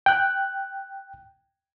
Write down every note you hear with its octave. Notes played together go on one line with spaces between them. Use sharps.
G5 F#6